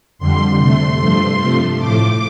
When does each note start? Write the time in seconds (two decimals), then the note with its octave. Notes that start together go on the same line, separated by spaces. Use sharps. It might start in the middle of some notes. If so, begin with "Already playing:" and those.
0.18 F2 D3 G3 C6
0.58 C3 A3 C6
1.00 G2 F3 A3
1.40 C3 F3 A3
1.79 A2 F3 A3 D6